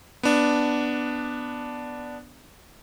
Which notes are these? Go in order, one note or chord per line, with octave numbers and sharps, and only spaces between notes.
B3 D4